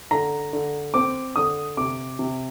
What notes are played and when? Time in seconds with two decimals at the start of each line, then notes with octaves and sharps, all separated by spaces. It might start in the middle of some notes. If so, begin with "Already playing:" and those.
0.11 D3 A#5
0.53 D3
0.94 C4 D6
1.36 D3 D#6
1.77 C3 D6
2.19 C3